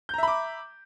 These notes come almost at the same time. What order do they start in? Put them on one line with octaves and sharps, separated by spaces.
G6 A#5 E5 B5 D6